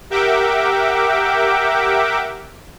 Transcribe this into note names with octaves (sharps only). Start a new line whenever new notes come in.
G4 A#4 E5 F#5 G5 D6